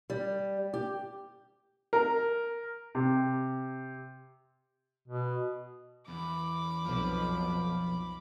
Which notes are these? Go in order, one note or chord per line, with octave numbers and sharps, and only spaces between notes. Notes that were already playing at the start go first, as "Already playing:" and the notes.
G3
G4
A#4
C3
B2
E2 B5 D6
B1 F2 B2 F3